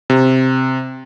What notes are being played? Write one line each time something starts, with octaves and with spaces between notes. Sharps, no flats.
C3